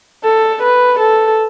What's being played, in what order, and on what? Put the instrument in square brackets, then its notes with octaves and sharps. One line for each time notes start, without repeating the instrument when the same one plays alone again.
[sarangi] A4
B4
A4